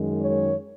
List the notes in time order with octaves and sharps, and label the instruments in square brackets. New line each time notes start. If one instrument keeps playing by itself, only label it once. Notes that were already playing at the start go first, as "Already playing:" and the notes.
Already playing: [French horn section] F#2 D#3 G#3
C#5